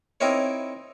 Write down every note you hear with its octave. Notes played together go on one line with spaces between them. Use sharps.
C4 D#4 E4 A#4 C#5